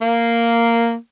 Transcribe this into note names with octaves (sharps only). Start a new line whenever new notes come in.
A#3